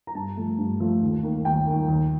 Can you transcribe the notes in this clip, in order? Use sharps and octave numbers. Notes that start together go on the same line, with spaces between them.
A#5
G2 A5
F3 A3
G2
F3 A3
D#2
D#3 A#3
D#2 G5
D#3 A#3
D#2